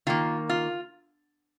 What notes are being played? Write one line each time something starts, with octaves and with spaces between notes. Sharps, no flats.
D#3 A#3 F4
F4